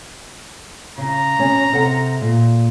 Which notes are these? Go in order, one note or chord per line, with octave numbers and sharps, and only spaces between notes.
C#3 A#5
B2 C#4
C3 A4 F#5
A#2